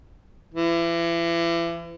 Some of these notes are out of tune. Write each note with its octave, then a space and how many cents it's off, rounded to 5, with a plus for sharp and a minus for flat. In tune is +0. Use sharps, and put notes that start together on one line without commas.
E3 +35